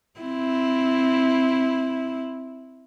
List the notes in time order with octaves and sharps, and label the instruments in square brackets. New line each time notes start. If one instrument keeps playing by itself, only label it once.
[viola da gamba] C4 E4